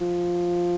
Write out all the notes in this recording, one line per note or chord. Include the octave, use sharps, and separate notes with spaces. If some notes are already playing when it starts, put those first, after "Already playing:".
F3